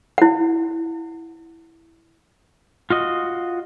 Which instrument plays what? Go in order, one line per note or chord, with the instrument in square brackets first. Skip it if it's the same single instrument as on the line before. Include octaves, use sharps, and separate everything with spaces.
[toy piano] E4 F#5
[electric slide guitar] F4 F#4 D#5